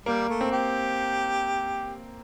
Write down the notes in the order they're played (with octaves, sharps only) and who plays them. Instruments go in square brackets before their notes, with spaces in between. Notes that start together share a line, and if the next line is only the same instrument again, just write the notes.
[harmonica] G3 [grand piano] A#3
[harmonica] A3
[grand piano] C4
[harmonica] G4